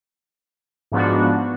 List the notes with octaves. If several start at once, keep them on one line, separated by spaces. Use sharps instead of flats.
G#2 F3 B3 D4 F#4